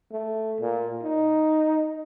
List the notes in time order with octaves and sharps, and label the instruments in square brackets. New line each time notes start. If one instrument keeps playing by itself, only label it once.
[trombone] A3
A#2
D#4